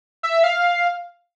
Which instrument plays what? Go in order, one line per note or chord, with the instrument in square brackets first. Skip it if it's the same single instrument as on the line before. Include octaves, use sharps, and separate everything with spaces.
[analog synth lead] E5
E5
F5